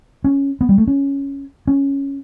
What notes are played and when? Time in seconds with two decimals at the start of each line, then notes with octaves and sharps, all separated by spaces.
0.24 C#4
0.61 B3
0.69 G3
0.78 A3
0.87 C#4
1.67 C#4